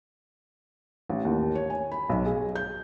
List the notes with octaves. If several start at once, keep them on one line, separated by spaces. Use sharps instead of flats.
A1
D#2
C#5
G#5
B5
B1
G#4
G6